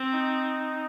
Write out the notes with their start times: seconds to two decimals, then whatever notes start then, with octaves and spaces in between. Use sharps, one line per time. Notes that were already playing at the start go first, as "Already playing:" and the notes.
Already playing: C4
0.13 D#4